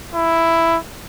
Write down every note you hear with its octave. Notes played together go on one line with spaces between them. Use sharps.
E4